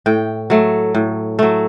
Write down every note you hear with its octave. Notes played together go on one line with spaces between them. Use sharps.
A2 G5
F#3 A3
A2
F#3 A3